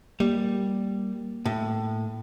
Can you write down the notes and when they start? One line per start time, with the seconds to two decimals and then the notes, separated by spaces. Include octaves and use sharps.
0.20 G3 A#3
1.46 A2